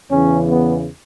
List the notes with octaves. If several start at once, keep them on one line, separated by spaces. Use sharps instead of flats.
E2 C#3 E3 C#4
B3